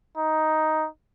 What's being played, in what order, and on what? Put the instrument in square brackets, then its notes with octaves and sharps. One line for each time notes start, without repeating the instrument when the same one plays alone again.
[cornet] D#4